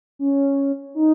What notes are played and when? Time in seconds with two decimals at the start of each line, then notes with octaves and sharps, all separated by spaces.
0.19 C#4
0.95 D#4